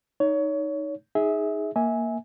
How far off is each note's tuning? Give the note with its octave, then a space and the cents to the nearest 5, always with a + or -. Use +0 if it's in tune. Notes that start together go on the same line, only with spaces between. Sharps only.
D#4 +0 C#5 +25
D#4 +10 G#4 +0 E5 -25
A#3 +0 E5 -25 G#5 +0